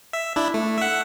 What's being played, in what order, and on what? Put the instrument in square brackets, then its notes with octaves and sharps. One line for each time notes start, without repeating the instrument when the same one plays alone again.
[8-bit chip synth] E5
D4 E4
A3
E5 F#5